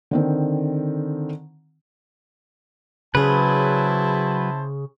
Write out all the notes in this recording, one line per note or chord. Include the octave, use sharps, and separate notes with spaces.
D3 D#3 C4
C#3 F#3 E4 G#4 B4 C5 A5